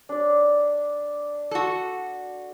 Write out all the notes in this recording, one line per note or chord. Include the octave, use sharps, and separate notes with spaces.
D4 D5
F#4 A4